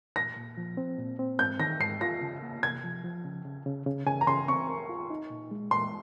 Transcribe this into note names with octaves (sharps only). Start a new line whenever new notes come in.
A#2 A#6
A#2
F3
C4
A#2
C4
G#2 G6
D#3 A#6
G#2 C7
F4 A#6
C#3
A#3
C3 G#6
F3
F3
C#3
C#3
C#3
C#3
C#3 G#5
A#5
C#3 C6
C4 C#6
A#4
F4
D#4
A#2
G#3
A#2 C6